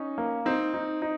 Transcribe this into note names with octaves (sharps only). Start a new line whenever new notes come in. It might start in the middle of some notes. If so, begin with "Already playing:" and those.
Already playing: C#4 D#4 D#5
A#3
C4 D#4
D#4
D#4